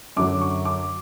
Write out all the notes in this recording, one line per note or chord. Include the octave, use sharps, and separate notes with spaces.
F#2 D3 F#3 D6
C#6
D6